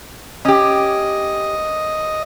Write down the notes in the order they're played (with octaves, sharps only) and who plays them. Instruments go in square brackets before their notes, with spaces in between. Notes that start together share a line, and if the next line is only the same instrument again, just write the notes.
[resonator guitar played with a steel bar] C#4 G4 [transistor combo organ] D#5